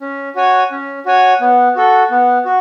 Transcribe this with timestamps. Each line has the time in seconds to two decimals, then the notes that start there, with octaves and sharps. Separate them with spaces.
0.01 C#4
0.35 F#4 C#5 G#5
0.71 C#4
1.05 F#4 C#5 G#5
1.41 B3
1.76 F#4 A4
2.10 B3
2.45 F#4